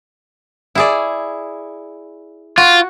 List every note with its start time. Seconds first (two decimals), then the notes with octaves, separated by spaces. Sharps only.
0.75 E4 G#4 D5
2.58 F4 F#4